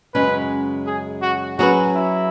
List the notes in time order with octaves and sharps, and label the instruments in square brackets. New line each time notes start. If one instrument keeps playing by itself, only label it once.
[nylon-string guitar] F#2 C#3 G#3 C#4 [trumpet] B4
[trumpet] G#4
F#4
[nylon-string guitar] F#3 C#4 G#4 B4 [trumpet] F#4
[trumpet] E4